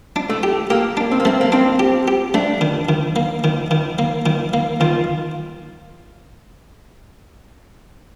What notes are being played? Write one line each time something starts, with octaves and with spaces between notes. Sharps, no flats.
D4
A3
G4
A#3 G4
D4
C4
A#3
A3 C4
A#3
C4 D4
G4
G4
A3 D4
D#3
D#3
A#3
D#3
D#3
A#3
D#3
A#3
D#3 F4